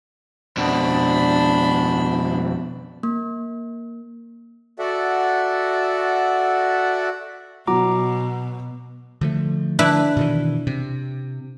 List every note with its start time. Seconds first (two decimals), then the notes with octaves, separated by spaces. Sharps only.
0.57 F2 B2 D4 B5
3.03 A#3
4.79 F#4 A4 D5 E5 F#5
7.67 B2 F#3 A#5 D6
9.21 D3 F3 A3
9.79 D4 E4 B4
10.17 B2 D#3 E3
10.67 C3